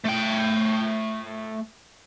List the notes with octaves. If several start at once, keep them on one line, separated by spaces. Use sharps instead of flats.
A3 G5